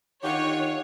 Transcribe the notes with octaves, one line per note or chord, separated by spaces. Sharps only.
D3 D#3 F4 G4 C#5 F#5